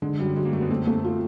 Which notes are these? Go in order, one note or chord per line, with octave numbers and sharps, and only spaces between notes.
D3 G#3
F#2 G3
F#2 G#3
A#3
F#2 A3
B3
A3 C4
A3
F4